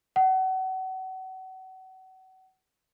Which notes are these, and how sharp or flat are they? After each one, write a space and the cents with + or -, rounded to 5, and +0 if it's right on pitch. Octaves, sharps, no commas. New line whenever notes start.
F#5 +35